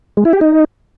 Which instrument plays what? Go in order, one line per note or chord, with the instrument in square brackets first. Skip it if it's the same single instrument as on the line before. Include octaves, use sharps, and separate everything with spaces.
[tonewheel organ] G#3
E4
G4
D#4